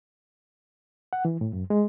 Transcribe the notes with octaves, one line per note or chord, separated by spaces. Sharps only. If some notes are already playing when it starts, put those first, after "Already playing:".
F#5
E3
A2
F#2
G#3